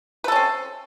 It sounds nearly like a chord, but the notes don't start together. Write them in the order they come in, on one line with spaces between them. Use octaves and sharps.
B4 A4 C#4 C4